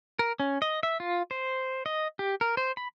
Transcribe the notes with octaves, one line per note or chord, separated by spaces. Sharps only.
A#4
C#4
D#5
E5
F4
C5
D#5
G4
A#4
C5
B5